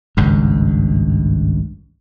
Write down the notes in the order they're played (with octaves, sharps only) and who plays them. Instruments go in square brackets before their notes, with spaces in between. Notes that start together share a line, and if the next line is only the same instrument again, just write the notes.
[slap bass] G#1 C#2 G2